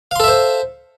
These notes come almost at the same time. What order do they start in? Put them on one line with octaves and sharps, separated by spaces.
F5 C6 A4 E5 C5